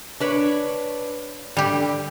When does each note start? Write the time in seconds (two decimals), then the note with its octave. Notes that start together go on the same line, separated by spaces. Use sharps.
0.20 D4 B4 C#5
1.57 D3 G3 G4